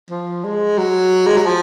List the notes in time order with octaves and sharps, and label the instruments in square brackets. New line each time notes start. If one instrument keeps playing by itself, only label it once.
[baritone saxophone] F3
G#3
F#3
G#3
F#3
F3